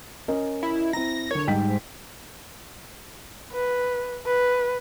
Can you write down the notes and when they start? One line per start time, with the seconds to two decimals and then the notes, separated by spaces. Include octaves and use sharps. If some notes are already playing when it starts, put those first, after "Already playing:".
0.28 C#4 A#4 D#5
0.63 E4
0.93 C4 E4 A#5 A#6
1.31 D3 A#4 C#5
1.48 G#2 G3 G5 B6
3.53 B4
4.26 B4